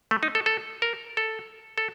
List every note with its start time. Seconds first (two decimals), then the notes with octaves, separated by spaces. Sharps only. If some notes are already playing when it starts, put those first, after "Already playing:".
0.11 A3
0.23 D#4
0.35 A4
0.46 A4
0.82 A#4
1.17 A4
1.78 A4